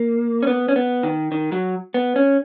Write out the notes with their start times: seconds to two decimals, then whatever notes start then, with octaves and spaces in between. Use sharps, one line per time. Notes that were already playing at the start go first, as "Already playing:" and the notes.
Already playing: A#3
0.42 C#4
0.47 B3
0.68 C#4
0.76 B3
1.03 D#3
1.32 D#3
1.52 F#3
1.94 B3
2.16 C#4